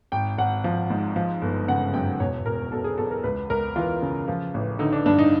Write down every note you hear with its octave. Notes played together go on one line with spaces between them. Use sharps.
G#1 G5
G#1 F#5
F3
G#2
F3
G1
C#3 F#5
F#2 G5
E1 C#5
E1 A#4
B2 A4
G#4
E2 A4
A#4
C#2 B4
C#2 A#4
E3 F4
C#3
F3
A1
D3 D#4
D4
G2 D4
D#4